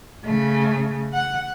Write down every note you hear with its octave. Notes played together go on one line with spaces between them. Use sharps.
C#3 A3
F#5